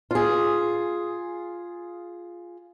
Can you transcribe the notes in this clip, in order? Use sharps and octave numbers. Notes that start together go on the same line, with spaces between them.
F4 G#4